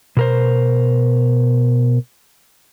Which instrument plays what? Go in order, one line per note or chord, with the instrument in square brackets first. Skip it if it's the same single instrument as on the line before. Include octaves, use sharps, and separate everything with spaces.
[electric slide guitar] B2 A#4 C5